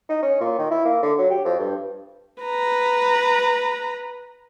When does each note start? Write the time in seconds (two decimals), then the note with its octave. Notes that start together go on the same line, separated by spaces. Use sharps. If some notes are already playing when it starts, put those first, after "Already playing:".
0.09 D#4
0.22 C#4
0.41 A#2
0.58 D#3
0.71 E4
0.85 A#3
1.02 D3
1.18 F#3
1.30 G4
1.45 F2
1.59 G2
2.43 B4 A#5